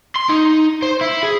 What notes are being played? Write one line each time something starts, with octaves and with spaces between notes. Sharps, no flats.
C6
D#4
C5
E4
G#4